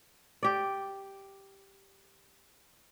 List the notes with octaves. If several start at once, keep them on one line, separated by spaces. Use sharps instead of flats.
G4 D5